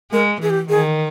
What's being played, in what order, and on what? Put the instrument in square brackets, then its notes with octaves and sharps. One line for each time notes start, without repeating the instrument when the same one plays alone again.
[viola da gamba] G#3 [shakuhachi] A#4
[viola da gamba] E3 [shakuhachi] G#4
[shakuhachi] G4
[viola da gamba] D#3 [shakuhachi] G#4